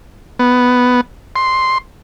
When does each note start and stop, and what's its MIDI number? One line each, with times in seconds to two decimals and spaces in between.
0.39 1.01 59
1.36 1.78 84